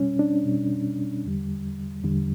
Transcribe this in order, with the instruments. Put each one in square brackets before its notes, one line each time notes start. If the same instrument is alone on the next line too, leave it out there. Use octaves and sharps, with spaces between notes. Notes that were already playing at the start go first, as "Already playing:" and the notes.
Already playing: [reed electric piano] B2 G3 C#4
D4
B2 G3
E2 D3 G3
E2 D3 G3